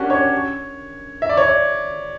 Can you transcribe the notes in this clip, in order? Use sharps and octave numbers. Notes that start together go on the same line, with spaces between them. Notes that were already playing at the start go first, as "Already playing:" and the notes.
Already playing: C#4 D4 F#4 G4 A#4
C#5
E5
D5
C#5
D5